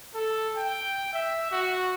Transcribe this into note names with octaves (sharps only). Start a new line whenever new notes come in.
A4
G5
E5
F#4